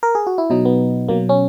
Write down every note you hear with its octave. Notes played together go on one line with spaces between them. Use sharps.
A#4
G#4
F#4
E4
B2 F#3 D#4
B3
B2 F#3 A#3
C#4